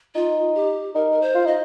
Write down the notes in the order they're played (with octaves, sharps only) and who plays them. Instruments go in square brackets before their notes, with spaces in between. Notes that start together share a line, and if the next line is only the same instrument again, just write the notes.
[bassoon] D#4 [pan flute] F4
[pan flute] G4
[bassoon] D#4 [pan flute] A#4
[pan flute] A#4
C5
[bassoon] F4
[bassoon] D#4 [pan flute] D#5